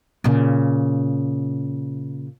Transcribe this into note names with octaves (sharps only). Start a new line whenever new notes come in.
A#2 C#3